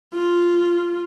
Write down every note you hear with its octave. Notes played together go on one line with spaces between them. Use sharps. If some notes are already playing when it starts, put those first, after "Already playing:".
F4